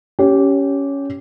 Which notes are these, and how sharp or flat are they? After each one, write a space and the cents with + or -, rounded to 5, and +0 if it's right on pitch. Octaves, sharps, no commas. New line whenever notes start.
C#4 +10 G4 -15